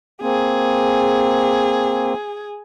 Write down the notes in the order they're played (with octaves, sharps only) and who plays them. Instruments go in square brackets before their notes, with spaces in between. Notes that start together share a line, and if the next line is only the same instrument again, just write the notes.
[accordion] A#3 C4 [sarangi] G#4